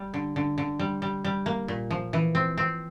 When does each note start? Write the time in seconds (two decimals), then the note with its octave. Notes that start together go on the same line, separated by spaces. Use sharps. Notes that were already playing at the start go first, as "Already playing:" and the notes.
Already playing: G3
0.14 D3
0.36 D3
0.58 D3
0.79 G3
1.02 G3
1.24 G3
1.46 A#3
1.68 A#2
1.91 F3
2.13 E3
2.35 C4
2.58 C4